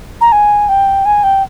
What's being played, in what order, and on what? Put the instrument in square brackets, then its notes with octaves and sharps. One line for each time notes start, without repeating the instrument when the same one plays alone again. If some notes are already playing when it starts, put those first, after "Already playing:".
[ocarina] A#5
G#5
G5
G#5
G5